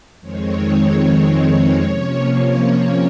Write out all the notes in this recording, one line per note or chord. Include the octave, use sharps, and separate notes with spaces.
F2 D#3 G#3 C4 C#5
C3 F3 A#3 C#4 C#5